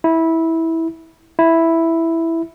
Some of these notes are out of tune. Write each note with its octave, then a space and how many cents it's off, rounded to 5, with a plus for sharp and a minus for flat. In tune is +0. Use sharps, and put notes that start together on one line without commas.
E4 -15
E4 +0